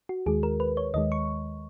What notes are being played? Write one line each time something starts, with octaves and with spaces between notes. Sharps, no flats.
F#4
D#2 D#3 G#3 G#4
A#4
B4
C#5
D#2 D#3 G#3 D#5
C#6